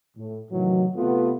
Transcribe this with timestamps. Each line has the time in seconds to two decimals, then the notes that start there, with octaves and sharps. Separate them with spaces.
0.17 A2
0.51 A2 C3 D#3 E3 F#3
0.96 C3 A3 B3 F4